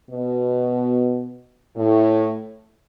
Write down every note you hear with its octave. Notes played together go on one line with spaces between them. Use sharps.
B2
A2